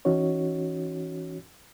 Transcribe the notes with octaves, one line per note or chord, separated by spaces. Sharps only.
E3 C#4 D#4 F#4 C#5